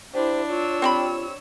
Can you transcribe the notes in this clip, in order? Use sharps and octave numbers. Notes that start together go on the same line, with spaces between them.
D4 E4 G4 C5
F4 C#5 E6
C4 G4 B5